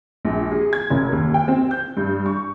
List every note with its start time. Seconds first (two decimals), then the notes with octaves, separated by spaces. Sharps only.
0.25 A#1
0.52 G#4
0.73 G#6
0.90 F#1
1.12 D#2
1.34 G5
1.48 C4
1.71 G6
1.97 G2
2.26 C#6